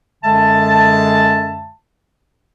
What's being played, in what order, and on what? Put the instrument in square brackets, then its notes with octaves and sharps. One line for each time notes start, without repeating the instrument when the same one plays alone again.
[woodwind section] F#2 D3 G#3 E5 A5